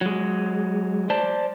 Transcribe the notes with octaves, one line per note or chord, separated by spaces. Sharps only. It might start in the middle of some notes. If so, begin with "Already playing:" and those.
F#3 G#3
C5 D5 A5